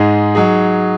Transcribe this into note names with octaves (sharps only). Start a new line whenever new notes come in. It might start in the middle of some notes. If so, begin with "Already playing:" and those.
Already playing: G#2 G#3 D#4 G#4
F#3 D#4 G#4